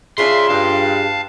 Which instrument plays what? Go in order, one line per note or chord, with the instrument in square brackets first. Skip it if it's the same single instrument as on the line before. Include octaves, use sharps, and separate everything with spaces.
[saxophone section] C#3 [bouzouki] D4 F4 G#4 [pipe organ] E5 [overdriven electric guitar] C6
[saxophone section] G2 [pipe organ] F5 A5